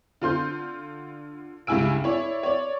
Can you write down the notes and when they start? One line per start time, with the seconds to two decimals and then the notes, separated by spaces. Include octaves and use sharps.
0.22 D3 F4 C6 G6
1.67 C#2 G2 E4 G#5 E6 D7
2.04 E4 C#5 D5
2.43 C#5 D5